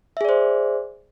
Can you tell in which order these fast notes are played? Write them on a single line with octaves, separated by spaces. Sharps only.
E5 G#4 D5 C5